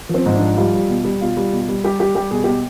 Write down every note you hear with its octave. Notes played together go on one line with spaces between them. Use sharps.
F3
C4
G#2
D4
F3
G3 F4
G3
B2
G3
B2 F4
G3
B2
G3
G3 G4
G3 G4
G3 G4
B2 G#4
B2 G4